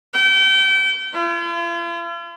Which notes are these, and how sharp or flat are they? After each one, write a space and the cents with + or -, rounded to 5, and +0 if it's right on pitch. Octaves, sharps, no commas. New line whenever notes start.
G5 -30
F4 -45